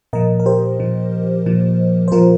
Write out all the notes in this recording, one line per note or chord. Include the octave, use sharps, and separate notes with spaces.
A#2 F3 A#4 D#5
A#4
G4 C5
A#2 F3
A#2 F3
C5
A#2 F3 F4 A#4